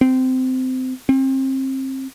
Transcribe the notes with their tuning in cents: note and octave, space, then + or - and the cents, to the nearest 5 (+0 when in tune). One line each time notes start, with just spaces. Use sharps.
C4 -20
C4 +30